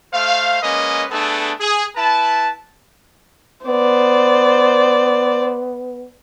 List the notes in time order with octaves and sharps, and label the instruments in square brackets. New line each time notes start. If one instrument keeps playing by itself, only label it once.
[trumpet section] A3 C5 F5
G#3 A#3 C#4 B4 D#5
A3 B3 D4 G#4 A4
G#4
E4 B4 A5
[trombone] B3 [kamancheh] C5 D5